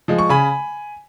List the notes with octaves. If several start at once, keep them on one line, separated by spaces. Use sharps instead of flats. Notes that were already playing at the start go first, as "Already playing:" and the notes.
F3 G#3
C#6
C#3 G#5 B5